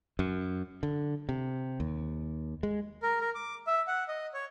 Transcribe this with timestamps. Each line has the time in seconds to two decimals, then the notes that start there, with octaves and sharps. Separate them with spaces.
0.19 F#2
0.83 D3
1.29 C3
1.80 D#2
2.63 G#3
3.02 A#4
3.21 A#4
3.35 D6
3.67 E5
3.87 F#5
4.08 D#5
4.34 C#5